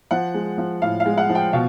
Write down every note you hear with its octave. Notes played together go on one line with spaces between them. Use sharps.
F3 F#5
G#3
F3
A2 F5
F5
G#3
F#5
F3
G5
B2 F5